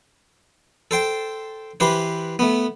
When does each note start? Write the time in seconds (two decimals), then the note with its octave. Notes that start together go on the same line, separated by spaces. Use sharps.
0.91 A4 C5 G5
1.80 E3 G4 B4 C5
2.39 A3 B3